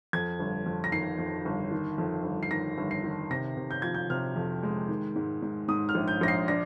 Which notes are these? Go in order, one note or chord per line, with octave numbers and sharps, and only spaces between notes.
F2 G#6
G1
F2
A#6
D#3 C7
F2
G1
D#3
F2
G1
C7
D#3 A#6
G1
C7
D#3
C3 A#6
C3
G6
F3 G#6
G6
C3 F6
F2
G#3
D#3
G#2
G#2
G#2 D#6
F6
A#1
G6
A#1 A#6
C7
D4 A#6